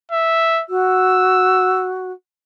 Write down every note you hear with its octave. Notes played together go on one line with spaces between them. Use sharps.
E5
F#4 E6